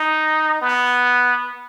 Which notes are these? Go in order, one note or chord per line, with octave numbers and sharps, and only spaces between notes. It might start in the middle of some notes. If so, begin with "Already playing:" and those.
Already playing: D#4
B3